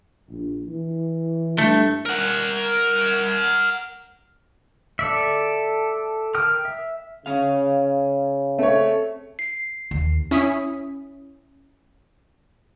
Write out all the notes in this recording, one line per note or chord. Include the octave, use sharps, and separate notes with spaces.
A#1
E3
G2 A3
A#4 F#5
A4 D5 E5
A#4 G5 D#6 F6
E5
C#3 C#4 F5
A3 C4 C#5
C7
D#2
C#4 E4 D#6 B6